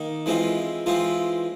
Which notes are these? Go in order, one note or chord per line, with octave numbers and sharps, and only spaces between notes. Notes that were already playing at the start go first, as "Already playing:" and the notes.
Already playing: D#3 A#3 D#4
E3 G#3 C4 F4
E3 G#3 C4 F4